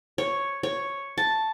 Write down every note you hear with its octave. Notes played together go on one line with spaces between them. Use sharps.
C#5
C#5
A5